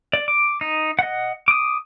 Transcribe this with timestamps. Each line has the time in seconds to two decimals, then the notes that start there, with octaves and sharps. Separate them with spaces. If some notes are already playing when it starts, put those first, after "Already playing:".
0.13 D5
0.28 D6
0.61 D#4
0.99 D#5 F#5
1.48 D6 D#6